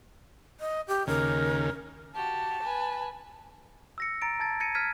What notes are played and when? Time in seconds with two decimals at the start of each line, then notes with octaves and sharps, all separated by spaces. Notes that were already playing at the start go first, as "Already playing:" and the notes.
0.60 D#5
0.88 G4
1.07 D#2 C#3 A#4
2.14 F#4 G4 A5
2.62 B4 G#5
3.98 E6 A#6 C#7
4.22 A#5 A6 D7
4.40 A5 G#6 A6
4.60 G#6 A#6 C#7 D#7
4.75 F6 G#6 B6 D#7